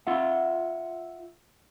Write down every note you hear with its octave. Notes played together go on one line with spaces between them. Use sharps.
F4 E5 F#5